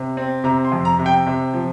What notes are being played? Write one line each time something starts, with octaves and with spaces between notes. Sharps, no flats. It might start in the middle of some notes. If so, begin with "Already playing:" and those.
Already playing: C3
C4
C3 A#5
C6
F2
A#5
C3
G5
C3
F3